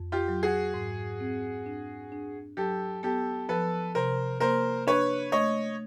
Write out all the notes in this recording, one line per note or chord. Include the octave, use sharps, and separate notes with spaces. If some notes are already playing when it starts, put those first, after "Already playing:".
Already playing: F2
F4 G4
F#3
F#4 G#4
G#2
C4
D4
D4
F#3 G4 A4
B3 G4 A4
F3 A4 B4
C3 A#4 C5
A#3 A#4 C5
D4 B4 C#5
A3 C#5 D#5